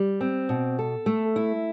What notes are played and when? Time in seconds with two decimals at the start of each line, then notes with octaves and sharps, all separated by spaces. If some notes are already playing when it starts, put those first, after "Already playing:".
Already playing: G3
0.21 C4
0.49 B2
0.79 A4
1.06 A3
1.36 E4